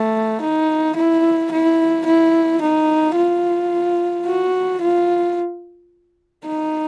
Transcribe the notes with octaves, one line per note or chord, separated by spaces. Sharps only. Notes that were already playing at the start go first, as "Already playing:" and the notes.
Already playing: A3
D#4
E4
E4
E4
D#4
F4
F#4
F4
D#4